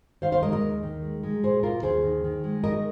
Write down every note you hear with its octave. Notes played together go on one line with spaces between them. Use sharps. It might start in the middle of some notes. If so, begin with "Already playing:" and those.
D#3 C5 F5
C5 F5
G#3 A#4 D#5
A#4 D#5
D#2
D#3
G#3
G#3
A#2 G#4 C5
A#2 F4 A#4
D#2 G#4 C5
D#3
D#3
G#3
D#3 A#4 D#5